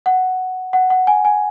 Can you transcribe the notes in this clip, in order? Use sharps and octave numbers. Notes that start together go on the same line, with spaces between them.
F#5
F#5
F#5
G#5
G#5